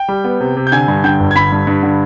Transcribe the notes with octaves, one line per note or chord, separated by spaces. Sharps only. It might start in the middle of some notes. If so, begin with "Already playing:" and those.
Already playing: G5
G3
B3
C3
C3
G6
D3 G#5 G#6
G2
D3 G5 G6
G1
G#6
D3 B5 B6
G2
G2
D3